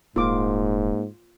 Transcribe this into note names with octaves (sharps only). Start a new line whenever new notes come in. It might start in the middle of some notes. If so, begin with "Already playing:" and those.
D#1 G#2 A#3 F4 D6